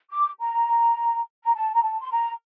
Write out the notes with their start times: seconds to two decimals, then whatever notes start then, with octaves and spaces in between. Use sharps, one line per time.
0.11 D6
0.40 A#5
1.45 A#5
1.54 A5
1.74 A#5
1.83 A5
2.01 C6
2.11 A#5